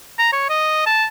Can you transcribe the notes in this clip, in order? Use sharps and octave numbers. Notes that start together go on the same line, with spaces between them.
A#5
C#5
D#5
A5